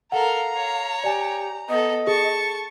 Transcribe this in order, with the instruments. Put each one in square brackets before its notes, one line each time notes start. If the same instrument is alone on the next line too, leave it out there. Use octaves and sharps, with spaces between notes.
[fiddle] A4 A#4 [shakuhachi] F5 [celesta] F#5 [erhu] A#5
[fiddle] C#5
[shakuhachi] G4 [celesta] D5 G#5
[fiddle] B3 A4 [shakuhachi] D#5
[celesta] G#4 A4 [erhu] A5 [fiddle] C#6